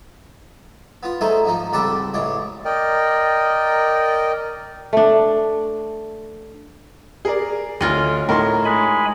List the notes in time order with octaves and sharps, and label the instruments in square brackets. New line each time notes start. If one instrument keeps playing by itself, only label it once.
[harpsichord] B3 F4
G#3 A3 D#4 G#4 C5
G#2 F3 D#4
C#2 G3 C4 A4 D5 F#5
A1 G#3 C#4 D5
[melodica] A#4 D5 D#5 G5
[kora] A3 D4
[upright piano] G#4 A#4 D5
[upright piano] D2 [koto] C#4 F4 D#5
[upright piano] A2 D#4 C6 [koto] A#4
[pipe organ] G#3 G#5 B5